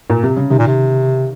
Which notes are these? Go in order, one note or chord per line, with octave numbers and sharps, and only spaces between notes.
A#2
C3
C#3
C3 D#3
A#2
C3